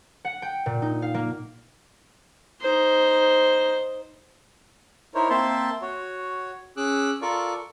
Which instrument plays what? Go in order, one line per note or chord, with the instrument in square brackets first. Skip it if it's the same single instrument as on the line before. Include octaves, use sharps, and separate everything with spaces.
[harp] F#5
G5
A#2
D#4
F5
A#3
[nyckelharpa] D#4 C5
[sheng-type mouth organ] D#4 E4 A#4 C5 C#5
A#3 C4 C5 E5 A5 C6
F#4 C#5
C#4 G#4 D6 E6 F#6
F4 A4 A#4 D5 C#6 D6